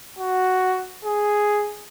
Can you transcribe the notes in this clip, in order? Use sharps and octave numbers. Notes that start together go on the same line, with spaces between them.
F#4
G#4